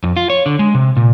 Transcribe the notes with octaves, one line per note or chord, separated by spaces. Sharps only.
F2
F4
C#5
D3
G#3
C3
A#2